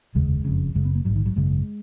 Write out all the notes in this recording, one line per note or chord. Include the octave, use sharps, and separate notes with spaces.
F1 D#2 C#3 G#3
F#1 F2 C#3
F#1 F#2 C#3 G#3
B3
A#3
A#1 G#2 F#3
D#3
F#3
G#1 F#2 C#3 G#3